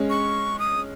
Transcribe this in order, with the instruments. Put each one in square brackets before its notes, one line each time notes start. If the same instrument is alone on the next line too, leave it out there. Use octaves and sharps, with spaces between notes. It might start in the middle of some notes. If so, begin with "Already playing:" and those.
Already playing: [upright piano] G#3 C#4
[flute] C#6
D#6